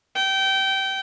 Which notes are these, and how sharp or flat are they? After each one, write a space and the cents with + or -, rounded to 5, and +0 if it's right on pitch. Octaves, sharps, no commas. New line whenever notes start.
G5 -20